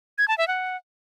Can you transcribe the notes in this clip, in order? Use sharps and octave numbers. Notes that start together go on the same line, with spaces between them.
G#6
A5
E5
F#5